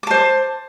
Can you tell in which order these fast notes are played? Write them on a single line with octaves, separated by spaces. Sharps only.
D6 A5 C5